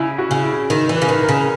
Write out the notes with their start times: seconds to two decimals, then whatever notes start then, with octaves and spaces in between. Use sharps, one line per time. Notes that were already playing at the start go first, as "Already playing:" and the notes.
Already playing: C#3 E4
0.18 F#4
0.31 C#3
0.44 E4
0.70 D#3
0.89 E3
0.96 B4
1.02 C#3
1.09 D#3
1.23 A#4
1.29 C#3